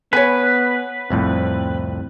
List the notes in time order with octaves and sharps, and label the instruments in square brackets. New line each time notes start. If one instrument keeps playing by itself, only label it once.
[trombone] B3 [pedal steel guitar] B4 [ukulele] C#5 G#5
[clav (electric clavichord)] C2 F2 A2 [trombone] C4